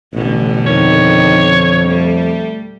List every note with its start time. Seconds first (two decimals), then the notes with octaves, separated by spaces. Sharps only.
0.13 A1 B2 D3
0.66 F2 D#3 C#5
1.87 G3 A3